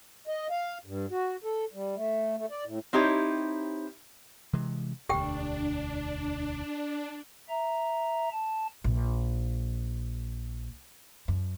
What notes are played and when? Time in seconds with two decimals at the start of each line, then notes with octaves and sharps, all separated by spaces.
0.28 D#5
0.50 F5
0.86 G2
1.11 F#4
1.44 A4
1.74 G3
1.95 A3
2.37 A3
2.51 D5
2.65 A2
2.93 C4 D#4 E4 G4 C#5
4.53 C3 E3 G#3
5.09 E1 D2 D4 G4 G5
7.49 E5 A#5
8.33 A5
8.84 A#1
11.28 F#2